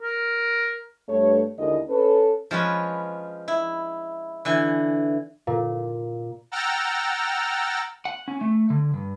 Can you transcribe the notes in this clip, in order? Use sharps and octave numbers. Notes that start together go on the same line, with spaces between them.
A#4
G2 A3 C#5
D#2 D3 G#3 E4 A#4 D#5
C#4 A4 B4
F3 G#3 C#4 B4
E4
D3 E3 G#5
A#2
F#5 G5 A#5 E6 F6 A6
F#5
C#4
A3
D3
G2